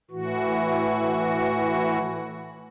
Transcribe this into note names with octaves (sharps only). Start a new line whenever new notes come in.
A2 E3 F#4